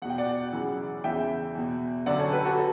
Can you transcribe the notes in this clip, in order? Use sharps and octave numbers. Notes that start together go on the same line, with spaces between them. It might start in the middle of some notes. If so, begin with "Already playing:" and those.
E2 B2 F#5 G5
D5 F#5
F#2 C#3 E3
E2 C#3 E3 E5 G5
E2 B2
F#2 D3 D5 F#5
A4 C#5
G4 B4
F#4 A4
A4